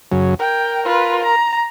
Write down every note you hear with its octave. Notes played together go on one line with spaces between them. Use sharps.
F#2 C#3 F#3
A#4 G5
F4 B4
A#5